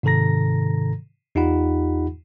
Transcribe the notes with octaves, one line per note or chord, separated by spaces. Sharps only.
G#2 C3 D#3 A4 A#5 A#6
E2 D#4 F4 G4 F#5 B5